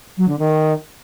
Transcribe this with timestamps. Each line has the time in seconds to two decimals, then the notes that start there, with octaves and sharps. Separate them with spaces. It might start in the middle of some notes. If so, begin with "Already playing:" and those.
0.17 F#3
0.28 D3
0.39 D#3